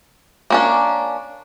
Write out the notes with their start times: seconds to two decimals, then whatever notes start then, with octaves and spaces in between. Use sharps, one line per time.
0.50 A#3 C#4 D4